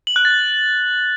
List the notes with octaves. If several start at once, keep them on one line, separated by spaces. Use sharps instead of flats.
F#7
F#6
A6